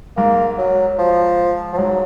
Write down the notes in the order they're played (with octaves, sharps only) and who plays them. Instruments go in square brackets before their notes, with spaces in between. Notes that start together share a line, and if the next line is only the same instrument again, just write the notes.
[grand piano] G#2 [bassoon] A#3
[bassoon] F#3
F3
F3
[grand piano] G#2 [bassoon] F#3